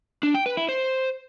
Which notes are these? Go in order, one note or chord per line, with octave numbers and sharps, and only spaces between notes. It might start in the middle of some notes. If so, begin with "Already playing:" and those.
D4
G5
B4
E4
C5